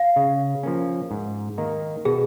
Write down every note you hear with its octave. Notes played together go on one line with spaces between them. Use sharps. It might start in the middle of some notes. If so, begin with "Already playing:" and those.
Already playing: F5
C#3
F3 A#3 C#4
G#2
D#3 A#3 D#4
B2 G#4